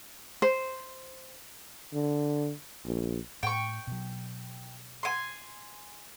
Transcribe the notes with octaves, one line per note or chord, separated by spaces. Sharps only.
C5
D3
A#1
A2 G5 C#6
B2 F#3
G#5 C6